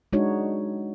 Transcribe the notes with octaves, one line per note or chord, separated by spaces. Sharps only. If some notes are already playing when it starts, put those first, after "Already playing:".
G#3 D4 D#4 F#4 C#5